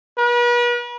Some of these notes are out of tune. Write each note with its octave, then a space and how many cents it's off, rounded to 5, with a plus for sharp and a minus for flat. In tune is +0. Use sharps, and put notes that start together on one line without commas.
B4 -40